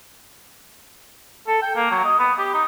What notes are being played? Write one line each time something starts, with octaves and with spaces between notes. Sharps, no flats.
A4
G5
A#3
F#3
D#5
B3
G4
D#4